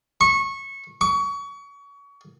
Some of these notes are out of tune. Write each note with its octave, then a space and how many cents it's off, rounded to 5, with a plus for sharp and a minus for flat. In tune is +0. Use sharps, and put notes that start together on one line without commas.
C#6 -20
C#6 +30